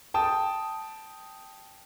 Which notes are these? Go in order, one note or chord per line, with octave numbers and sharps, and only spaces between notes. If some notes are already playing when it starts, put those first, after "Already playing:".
G5 A5 D#6